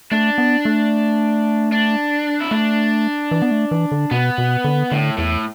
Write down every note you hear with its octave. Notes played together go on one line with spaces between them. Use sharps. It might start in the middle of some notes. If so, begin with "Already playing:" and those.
A3 D4
B3
A3
D4
E4
A3 D4
E3
B3
A3
E3
D3
B2 B3
B2
D3
A2 D3
E2 A2